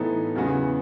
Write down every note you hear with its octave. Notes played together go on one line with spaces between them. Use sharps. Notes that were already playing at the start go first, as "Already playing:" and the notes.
Already playing: A2 E3 B3 D#4 A4
E2 C#3 F#3 B3 F#4